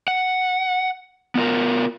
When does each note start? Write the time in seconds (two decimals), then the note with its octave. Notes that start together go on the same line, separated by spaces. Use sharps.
0.08 F#5
1.35 B3 F4 A#4